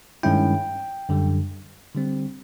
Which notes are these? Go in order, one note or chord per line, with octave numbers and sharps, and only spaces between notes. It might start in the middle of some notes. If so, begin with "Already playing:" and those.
G2 D#3 G#3 C#4 E4 G5
F#2 D3 G3
D3 G3 C4